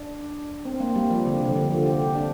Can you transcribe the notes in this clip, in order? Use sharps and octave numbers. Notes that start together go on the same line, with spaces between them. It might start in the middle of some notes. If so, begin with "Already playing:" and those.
Already playing: D4
C4
A#3
G3
F3
D3
C3
F3
D3
F3
G4
D4